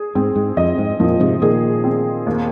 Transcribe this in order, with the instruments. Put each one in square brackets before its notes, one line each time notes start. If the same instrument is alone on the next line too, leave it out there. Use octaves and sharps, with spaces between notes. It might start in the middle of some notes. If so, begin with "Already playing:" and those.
Already playing: [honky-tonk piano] G#4
[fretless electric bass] G#2 [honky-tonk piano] C4
[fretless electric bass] G#2
[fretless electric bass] F2 [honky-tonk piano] D#5
[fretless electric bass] G#2
[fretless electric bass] F2 A#2 [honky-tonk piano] F3
[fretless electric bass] G#2 C3
[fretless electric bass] A#2 D#3 [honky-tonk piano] G#4
[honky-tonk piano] C4
D#2